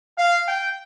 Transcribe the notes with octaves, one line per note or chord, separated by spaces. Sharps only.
F5
G5